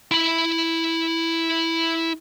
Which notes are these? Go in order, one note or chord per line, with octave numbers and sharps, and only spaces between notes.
E4 B5